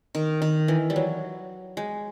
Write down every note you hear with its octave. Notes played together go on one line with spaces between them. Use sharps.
D#3
D#3
E3
G3
F#3
G#3